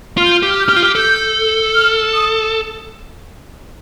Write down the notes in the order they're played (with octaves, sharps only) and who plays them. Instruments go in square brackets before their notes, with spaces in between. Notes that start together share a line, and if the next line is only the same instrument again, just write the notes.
[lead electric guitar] F4 [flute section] F6
[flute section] G6
F6
[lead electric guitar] G4 [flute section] G6
[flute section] F6
G6
[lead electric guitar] G4 [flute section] F6
[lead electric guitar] F4 [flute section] G6
[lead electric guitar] G4 [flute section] F6
[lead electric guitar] A4 [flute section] G6
[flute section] F6
D#6